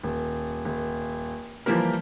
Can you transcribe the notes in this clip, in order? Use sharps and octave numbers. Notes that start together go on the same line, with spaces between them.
D#1
D#1
E3 F3 G3 A#3 G4 A#4